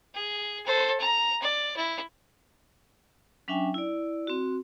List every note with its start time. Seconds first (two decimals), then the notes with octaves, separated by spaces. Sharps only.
0.14 G#4
0.66 A4 C5
1.00 A#5
1.42 D5
1.77 E4
3.48 F#3 C#4 D4 E5 G5 G#5
3.74 E4 D5
4.27 C4 F#4